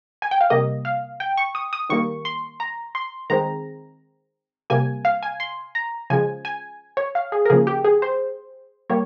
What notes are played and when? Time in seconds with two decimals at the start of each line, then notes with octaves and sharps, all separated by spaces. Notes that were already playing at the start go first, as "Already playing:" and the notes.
0.22 G#5
0.31 G5
0.41 F5
0.50 C3 G3 A#3 D#5
0.85 F5
1.20 G5
1.37 C#6
1.55 D#6
1.73 D#6
1.89 D#3 G3 A#3 C#6
2.25 C6
2.60 A#5
2.95 C6
3.30 D#3 G#3 C4 A#5
4.70 C3 G3 A#3 G#5
5.05 F5
5.23 G#5
5.40 C6
5.75 A#5
6.10 C#3 F3 G#3 G#5
6.45 G#5
6.97 C#5
7.15 F5
7.32 G#4
7.45 A#4
7.50 C#3 F3 A#3 G#4
7.67 G4
7.85 G#4
8.02 C5
8.90 G3 A#3 C#5